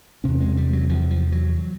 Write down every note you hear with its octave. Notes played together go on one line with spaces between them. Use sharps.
E2 C3 C#4
G#3
G3
F#3
E2 C3 F3
F3
F#3